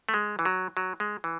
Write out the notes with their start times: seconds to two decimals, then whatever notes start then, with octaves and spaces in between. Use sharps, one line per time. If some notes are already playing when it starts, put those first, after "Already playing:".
0.09 A3
0.14 G#3
0.39 E3
0.45 F#3
0.77 F#3
1.00 G#3
1.24 E3